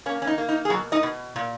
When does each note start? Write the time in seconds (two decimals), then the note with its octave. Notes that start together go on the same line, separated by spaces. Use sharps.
0.06 A#3 C#4
0.22 C#4
0.27 D#4
0.38 A#3
0.49 D#4
0.65 G#4
0.70 B2 F#3 F#4
0.92 D#4 D#5
1.03 B2
1.36 A#2